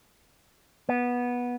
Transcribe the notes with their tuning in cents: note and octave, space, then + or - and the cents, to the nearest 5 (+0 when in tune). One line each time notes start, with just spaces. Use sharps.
B3 -15